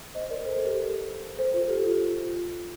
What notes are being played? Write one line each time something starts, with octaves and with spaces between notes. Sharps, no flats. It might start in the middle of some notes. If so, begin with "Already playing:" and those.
C5 D#5
A#4 D5
A4 C5
A4 C5
G4 A#4
A4 C5
F4 A4
G4
F4